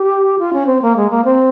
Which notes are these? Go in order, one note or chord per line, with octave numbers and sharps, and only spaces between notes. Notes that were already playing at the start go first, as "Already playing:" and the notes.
Already playing: G4
F4
C#4
C4
A#3
G#3
A#3
C4